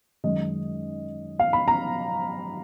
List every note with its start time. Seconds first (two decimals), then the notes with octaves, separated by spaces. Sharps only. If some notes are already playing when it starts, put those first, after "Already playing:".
0.24 F#2 D#3 G#3 C#4 D#5
1.39 F5
1.53 B5
1.68 A#5